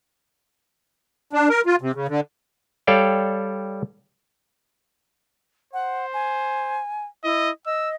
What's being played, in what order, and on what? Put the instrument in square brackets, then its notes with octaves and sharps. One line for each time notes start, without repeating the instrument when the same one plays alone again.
[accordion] D4
A#4
F4
C3
C#3
D3
[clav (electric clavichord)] G3 A4 C#5 D5 F5 G5
[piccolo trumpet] C5 [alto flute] F#5
[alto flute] G#5
[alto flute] E4 [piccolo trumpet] D#5
[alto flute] D#5 [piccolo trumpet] E6